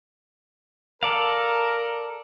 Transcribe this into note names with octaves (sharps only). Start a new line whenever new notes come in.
A4 A#4 D5 F5